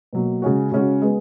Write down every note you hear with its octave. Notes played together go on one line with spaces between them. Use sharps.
B2 F#3 A#3
C#3 G#3 C#4 F#4
C#3 G#3 C#4 F#4
G#3 B3